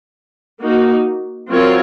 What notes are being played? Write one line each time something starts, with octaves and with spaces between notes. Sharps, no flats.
A#3 D#4 F#4
F#3 C4 F4 A#4 C#5